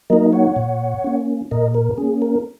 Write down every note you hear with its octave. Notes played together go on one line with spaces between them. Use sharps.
F#3 A#3 D#4 A#4 D#5
C#5 F#5
A#2
A#3 C#4
A#2 A#4 D#5
A#4
A#3 C#4 G#4
A#4